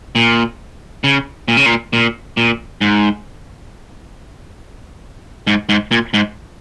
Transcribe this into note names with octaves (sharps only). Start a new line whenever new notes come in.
A#2
C#3
A#2
C#3
A#2
A#2
A#2
G#2
G#2
G#2
A#2
G#2